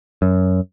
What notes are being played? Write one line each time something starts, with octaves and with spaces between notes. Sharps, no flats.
F#2